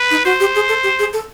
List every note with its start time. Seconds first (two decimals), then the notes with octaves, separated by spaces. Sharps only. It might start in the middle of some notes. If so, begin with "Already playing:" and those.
Already playing: B4
0.11 D#4
0.25 F#4 C5
0.40 G4
0.55 G#4
0.69 A4
0.83 G4
0.99 G#4
1.13 A4